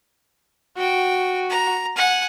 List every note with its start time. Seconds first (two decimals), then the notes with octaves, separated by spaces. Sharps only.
0.77 F#4 G5
1.49 A#5
1.96 F#5 G#5